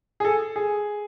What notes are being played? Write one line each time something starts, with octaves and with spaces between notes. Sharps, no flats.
G#4
A4
G#4